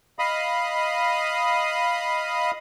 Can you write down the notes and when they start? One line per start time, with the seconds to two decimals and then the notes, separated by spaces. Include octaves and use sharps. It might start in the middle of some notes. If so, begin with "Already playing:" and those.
0.19 D#5 F5 B5 D#6